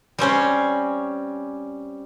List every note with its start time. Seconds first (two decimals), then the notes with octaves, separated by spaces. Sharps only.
0.19 G3 C4 C#4 C5